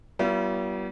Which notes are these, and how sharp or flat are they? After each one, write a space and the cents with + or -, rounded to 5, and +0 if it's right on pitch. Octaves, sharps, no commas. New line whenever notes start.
G3 -40 B3 -30 E4 +45